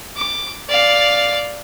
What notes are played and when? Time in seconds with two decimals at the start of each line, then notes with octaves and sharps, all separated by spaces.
0.17 D6
0.70 D5 F5